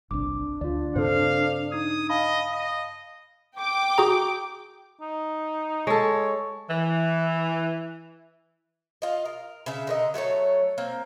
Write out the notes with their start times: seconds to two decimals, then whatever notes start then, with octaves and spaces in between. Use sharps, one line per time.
0.11 G1 C2 D4 D6
0.61 D2 F4 D5
0.96 G2 C#3 C4 A4 C5 F5
1.72 D#4 D#6 G#6
2.10 D#5 F5 A5 B5
2.52 D#5
3.56 G5 D6
3.98 F#4 G#4 A#5
5.01 D#4
5.87 G#3 A4 C#5
6.69 E3
9.02 F4 D#5
9.25 A#4
9.66 C#3 E5
9.87 D3 A#4 D#5
10.14 F#3 A3 A4 C#5
10.78 A#3 C4